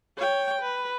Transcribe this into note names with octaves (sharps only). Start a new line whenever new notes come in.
C#5 G5
B4